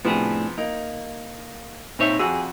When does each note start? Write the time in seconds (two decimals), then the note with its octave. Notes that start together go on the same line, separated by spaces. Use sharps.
0.05 A2 C3 F3 B3 D4 G#4
0.58 A#3 D#4
1.99 A#2 C4 D#4 C5 C#5 E5
2.19 F2 F#4 G#4 E6